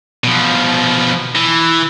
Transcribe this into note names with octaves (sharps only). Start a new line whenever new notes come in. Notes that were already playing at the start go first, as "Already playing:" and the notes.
B2 F3
E3